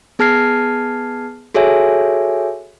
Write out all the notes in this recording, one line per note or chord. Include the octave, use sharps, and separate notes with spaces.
B3 G#4 A5 F6 G#6 C7
F#4 G#4 A4 C#5 E5 G#5